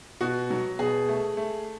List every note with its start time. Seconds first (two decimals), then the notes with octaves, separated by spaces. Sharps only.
0.21 B2 F#4
0.50 F#3
0.79 B2 G#4
1.09 A3
1.37 A3